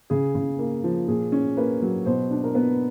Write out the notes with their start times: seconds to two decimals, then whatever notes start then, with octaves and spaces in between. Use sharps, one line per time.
0.10 C#3 G#4
0.35 C#3
0.59 A#3
0.84 F3
1.08 A#2 G#4
1.32 C#4
1.57 A#3 B4
1.82 F#3
2.06 B2 C5
2.31 D4
2.44 A#4
2.55 B3 B4